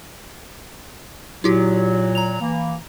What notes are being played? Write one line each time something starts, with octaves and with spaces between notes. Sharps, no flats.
A#2 F#3 E4 F#4 G4
A#5 F7
E3 A#3